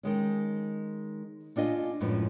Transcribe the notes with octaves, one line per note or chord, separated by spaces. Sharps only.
D#3 G#3 C#4
A3 D4 F4 D#5 G#5
F#2 A2 E3 F3 G#3